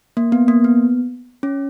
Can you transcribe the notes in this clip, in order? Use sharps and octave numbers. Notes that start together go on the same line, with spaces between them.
A#3
B3
A#3
B3
C#4